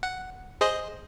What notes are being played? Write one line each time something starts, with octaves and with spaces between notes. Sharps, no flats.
F#5
G#4 C5 D#5